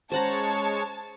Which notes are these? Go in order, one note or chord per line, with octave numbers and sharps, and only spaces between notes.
G#3 C#4 C5 C#5 F#5 A5 A#5